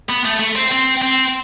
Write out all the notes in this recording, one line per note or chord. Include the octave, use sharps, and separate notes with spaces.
B3
A3
A3
C4
C4
C4